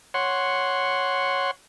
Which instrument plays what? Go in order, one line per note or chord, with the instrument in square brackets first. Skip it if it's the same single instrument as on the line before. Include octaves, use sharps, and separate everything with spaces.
[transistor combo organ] C#5 F#5 C6